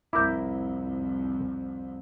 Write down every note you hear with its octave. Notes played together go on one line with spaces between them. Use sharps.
C2 F2 E4 A#4 E5 D6 G6